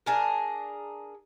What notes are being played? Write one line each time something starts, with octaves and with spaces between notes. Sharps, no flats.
D4 G#4 A#4